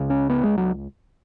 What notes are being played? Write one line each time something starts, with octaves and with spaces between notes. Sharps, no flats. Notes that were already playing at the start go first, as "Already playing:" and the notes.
Already playing: C#2 C#3
C#4
B3
G#3
F#3